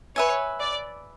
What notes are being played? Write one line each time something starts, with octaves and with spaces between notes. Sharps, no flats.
B4 C#5 E5 G#5
D5